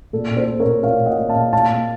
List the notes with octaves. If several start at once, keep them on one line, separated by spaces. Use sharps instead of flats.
A#2 A4
A#2
A4 C5
A#2
A#4 C#5
A#2
A#2 C#5 F5
A#2
D#5 F#5
A#2
F5 A5
A#2
A#2 F5 A5
A#2